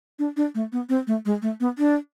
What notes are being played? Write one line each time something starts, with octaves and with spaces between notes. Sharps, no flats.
D4
D4
A3
B3
C4
A3
G#3
A3
B3
D4